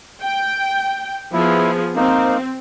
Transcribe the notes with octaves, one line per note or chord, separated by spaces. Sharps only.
G5
F3 B3 E4 G#4
A#3 C4 D#4